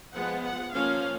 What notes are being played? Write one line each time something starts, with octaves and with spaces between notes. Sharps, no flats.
F3 G#3 B3 F#5
F#5
F3 A#3 C#4 F5